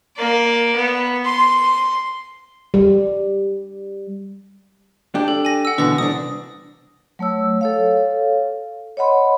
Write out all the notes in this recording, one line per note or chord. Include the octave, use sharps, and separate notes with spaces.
A#3 D5
B3
C6
G3
D4 G4
A4
G#5 A#6
F#5 E6
E2 B2 D3 B4 A#6
C2 D4 D#6
F#3 A3 C#5 E6
A4 C#5 F5
C#5 D#5 F#5 B5 C6